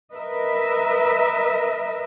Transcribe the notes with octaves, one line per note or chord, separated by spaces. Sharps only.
A#4 B4 D#5 E5